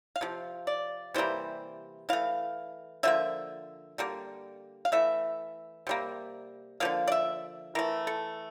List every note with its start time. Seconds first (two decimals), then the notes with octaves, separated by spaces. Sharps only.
0.16 F5
0.21 C3 F3
0.67 D5
1.14 C3 E3 G3 A#3 C5
2.09 E3 A3 F5
3.03 D3 F3 A#3 E5
3.98 D3 G3 A#3
4.85 F5
4.92 E3 A3 E5
5.87 C3 G3 A#3
6.80 D3 F3 A#3 F5
7.08 D5
7.12 E5
7.75 E3 A3 A#4
8.07 A4